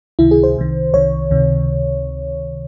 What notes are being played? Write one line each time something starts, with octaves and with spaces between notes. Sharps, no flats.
C#2 C3 D#3 E4
G#4
C5
C2 C3 D#3
C2 C3 D#3 C#5
C#2 C3 D#3